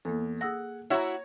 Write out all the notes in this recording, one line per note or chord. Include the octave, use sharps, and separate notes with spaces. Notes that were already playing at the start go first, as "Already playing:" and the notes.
E2 A#3 A4
G#4 F#5 D#6 E6 A#6
E4 F#4 C#5 E5 A#5